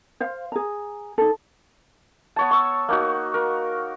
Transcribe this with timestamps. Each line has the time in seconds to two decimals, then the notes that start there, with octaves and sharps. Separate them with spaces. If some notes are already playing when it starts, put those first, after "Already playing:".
0.20 C5 F5
0.52 G#4 A#5
1.18 D#4 A4
2.36 B3 C#5 A5
2.51 C#6 E6
2.89 A#3 D#4 F#4
3.34 A#4